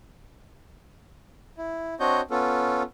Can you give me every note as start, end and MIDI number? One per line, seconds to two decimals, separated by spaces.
1.58 1.94 64
2.00 2.21 60
2.00 2.21 62
2.00 2.21 66
2.00 2.21 73
2.00 2.21 75
2.00 2.21 91
2.31 2.82 59
2.31 2.82 61
2.31 2.82 65
2.31 2.82 69